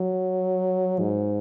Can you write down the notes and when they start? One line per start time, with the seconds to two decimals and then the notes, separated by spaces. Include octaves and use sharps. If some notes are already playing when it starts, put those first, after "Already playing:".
Already playing: F#3
0.99 G#2